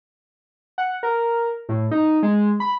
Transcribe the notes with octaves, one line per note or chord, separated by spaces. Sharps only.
F#5
A#4
A2
D#4
G#3
B5